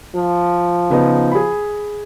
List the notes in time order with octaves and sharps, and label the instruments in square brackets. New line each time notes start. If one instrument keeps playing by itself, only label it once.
[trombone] F3
[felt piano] C#3 B3 D#4
G#4 B5